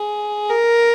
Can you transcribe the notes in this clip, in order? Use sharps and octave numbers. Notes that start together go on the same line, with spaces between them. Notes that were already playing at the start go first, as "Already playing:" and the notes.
Already playing: G#4
A#4